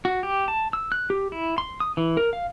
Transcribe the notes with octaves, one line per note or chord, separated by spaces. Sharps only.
F#4
G4
A5
E6
F#6
G4
E4
C6
D#6
E3
A#4
F5